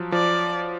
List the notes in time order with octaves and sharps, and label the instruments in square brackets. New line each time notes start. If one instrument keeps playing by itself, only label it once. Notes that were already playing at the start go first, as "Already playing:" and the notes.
Already playing: [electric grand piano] F3 F#3
[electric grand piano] F3 [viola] D5